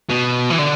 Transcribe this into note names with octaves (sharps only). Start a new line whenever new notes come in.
B2
E3
D3